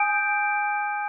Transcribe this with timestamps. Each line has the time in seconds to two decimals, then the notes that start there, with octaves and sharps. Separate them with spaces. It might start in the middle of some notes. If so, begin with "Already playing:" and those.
Already playing: G#5 D#6 G6 D7